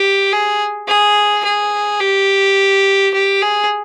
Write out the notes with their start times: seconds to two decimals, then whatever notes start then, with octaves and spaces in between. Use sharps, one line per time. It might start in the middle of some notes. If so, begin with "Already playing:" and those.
Already playing: G4
0.32 G#4
0.88 G#4
1.44 G#4
2.00 G4
3.14 G4
3.42 G#4